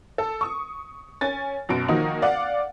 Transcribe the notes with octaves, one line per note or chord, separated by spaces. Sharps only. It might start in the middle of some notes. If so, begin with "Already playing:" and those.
A4
C#6 D#6
C#4 G#5 A6
F#2 B2 D7
D#3 F3 A#3 D#4 F#4
D5 F5 F#5